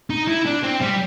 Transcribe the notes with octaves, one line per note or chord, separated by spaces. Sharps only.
D#4
E4
D4
C4
G3